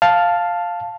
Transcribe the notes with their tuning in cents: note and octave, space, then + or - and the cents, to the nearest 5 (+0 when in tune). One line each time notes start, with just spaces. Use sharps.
F5 +0 A5 +0